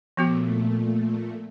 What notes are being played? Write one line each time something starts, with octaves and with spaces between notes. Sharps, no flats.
A#2 F3 A3 B3 F#4